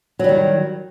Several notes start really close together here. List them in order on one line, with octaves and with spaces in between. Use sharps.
F#3 G3 D#3